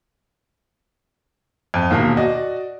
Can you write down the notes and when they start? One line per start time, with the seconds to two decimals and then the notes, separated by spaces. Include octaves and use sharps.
1.74 F2
1.90 E1 D#2 A#2 A#4 F5
2.17 F#4 D5 D#5